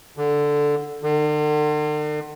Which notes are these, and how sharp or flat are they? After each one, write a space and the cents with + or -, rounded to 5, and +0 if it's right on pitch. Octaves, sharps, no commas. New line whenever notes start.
D3 +0
D3 +45